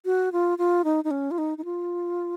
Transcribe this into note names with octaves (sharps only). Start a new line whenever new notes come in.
F#4
F4
F4
D#4
D#4
C#4
F4
D#4
D#4
F4